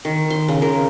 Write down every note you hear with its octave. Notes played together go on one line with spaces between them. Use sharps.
D#3
C6
C#3
A#4